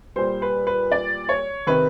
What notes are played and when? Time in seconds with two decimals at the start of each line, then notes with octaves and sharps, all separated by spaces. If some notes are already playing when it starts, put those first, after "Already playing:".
0.16 A#2 G3 C5
0.42 B4
0.67 B4
0.92 D5
1.29 C#5
1.67 C3 D#3 B4